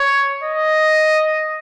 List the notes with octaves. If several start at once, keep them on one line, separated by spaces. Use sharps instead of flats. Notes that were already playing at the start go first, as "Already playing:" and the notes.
Already playing: C#5
D#5